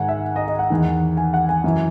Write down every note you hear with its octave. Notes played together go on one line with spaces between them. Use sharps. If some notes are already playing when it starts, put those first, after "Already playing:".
Already playing: G#2 D#3 F#5 G#5
E5
D#5
D#5
F#5
E2 D#3
G#5
F#5
G#5
F#2 E3